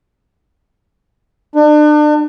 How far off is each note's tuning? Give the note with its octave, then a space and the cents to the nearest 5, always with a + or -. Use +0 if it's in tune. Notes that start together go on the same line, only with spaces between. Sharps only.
D4 +35